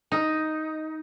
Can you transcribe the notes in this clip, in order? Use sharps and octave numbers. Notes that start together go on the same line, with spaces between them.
D#4